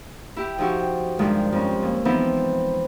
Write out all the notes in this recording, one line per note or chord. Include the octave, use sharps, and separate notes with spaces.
E4 G4
F3 D#4 E4 F#4 G4
G2 D#3 F3 G#3 D4
F2 C#4
D#2
E3 F3 B3 C4 D#4 E4